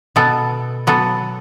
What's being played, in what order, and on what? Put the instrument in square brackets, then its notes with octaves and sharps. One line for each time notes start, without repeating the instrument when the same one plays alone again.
[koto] B2 B3 A4
F#3 B3 F#4 A4